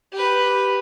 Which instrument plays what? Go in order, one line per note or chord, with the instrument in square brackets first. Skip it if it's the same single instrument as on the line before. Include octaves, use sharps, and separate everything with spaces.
[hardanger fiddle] G4 B4